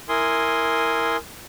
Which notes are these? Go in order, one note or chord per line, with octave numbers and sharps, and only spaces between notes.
E4 A#4 G#5 C6 D#6